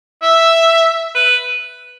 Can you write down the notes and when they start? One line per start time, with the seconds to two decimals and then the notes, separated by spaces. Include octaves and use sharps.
0.22 E5
1.15 B4